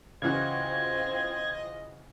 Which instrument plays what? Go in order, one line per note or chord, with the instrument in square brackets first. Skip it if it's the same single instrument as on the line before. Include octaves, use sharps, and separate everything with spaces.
[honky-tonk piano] C#3 E3 F#4 [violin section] C4 F4 C5 [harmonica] D#5 [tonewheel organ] G#6